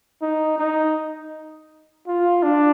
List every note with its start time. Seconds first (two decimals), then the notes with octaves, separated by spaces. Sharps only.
0.22 D#4
0.58 D#4
2.07 F4
2.43 D4